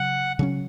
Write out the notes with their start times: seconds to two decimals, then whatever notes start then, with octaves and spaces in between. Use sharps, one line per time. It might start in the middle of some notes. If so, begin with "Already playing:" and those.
Already playing: C#3 F#3 F#5
0.39 C#3 F#3 C#4